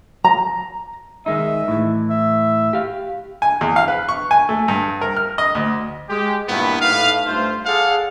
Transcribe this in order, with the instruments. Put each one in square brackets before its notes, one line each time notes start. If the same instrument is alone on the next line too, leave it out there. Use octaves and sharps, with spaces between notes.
[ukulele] A#5
[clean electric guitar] D#3 G#3 D#4 [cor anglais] E5
[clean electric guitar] A2 E3
[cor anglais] E5
[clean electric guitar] G4 F5
[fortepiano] G#5
E2
F5
B4
C#6
G#5
A3
G2
A#4
F6
D#5
D2
[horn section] G#3 G4
G2 A#2 D#3 B3 E4
A2 D#4 B4 F5
G2 A3 F4 C5
G#4 A4 D5 F5 F#5